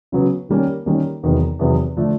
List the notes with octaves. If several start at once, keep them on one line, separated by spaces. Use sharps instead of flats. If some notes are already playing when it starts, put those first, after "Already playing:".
C#3 F#3 B3
D#3 G3 A#3 C#4
D#3 G3 A#3 C#4
E2 C3 D#3 F#3 B3
E2 C3 D#3 F#3 B3
D3 F3 A3 D4